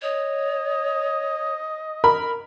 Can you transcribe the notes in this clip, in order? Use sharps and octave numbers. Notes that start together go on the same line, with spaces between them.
C#5 D#5
A#4 B5